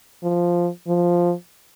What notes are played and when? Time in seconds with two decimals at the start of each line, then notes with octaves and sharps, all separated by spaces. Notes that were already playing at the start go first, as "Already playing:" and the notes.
0.23 F3
0.88 F3